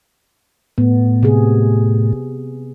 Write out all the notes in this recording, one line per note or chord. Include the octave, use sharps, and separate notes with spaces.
A2 B3
C3 G#4